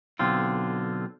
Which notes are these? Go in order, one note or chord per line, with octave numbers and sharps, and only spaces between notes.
B1 D3 C4 F4